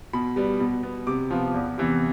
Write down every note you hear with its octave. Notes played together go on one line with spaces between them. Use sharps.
B2 B5
G3 B3
B2
B3
C3 D6
F3 B3
E2
C3 E3 B3